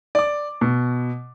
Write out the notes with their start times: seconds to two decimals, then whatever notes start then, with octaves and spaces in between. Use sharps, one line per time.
0.15 D5 D6
0.61 B2